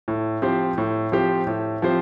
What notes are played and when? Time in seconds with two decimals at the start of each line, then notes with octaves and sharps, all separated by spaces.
0.08 A2
0.42 F3 C4 G4 C5
0.78 A2
1.12 F3 C4 G4 C5
1.47 A2
1.82 F3 C4 G4 C5